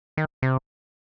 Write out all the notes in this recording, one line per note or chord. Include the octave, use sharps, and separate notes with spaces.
D#3
C3